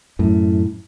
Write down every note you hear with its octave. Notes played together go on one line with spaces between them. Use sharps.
F#2 A2